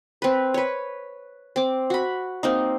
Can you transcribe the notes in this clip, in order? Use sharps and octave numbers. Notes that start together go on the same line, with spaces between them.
C4 B4
B4 C#5
C4 D6
F#4 B5
A#3 C4 D#4